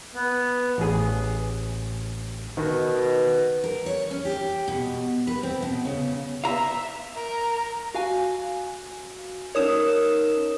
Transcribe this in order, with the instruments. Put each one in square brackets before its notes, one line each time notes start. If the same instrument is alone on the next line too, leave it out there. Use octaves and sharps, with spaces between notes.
[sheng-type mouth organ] B3
[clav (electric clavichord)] A1 G#4
[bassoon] B2 [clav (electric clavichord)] D#3
[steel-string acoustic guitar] A#4
C#5
C#4
G4
B2
B4
C4
B2
C#3
[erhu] E5 [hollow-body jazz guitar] F5 A#5
[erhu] A#4
[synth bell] F#4 F5 G#5
[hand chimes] C#4 D#4 A#4 [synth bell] C#5 D#6 E7